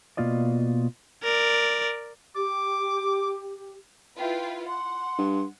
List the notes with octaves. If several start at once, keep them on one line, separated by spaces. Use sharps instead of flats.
B2 A#3 F4 D5 D#5
A#4 D5
G4 D6
E4 F4 B4 G5
F#5 C6
G2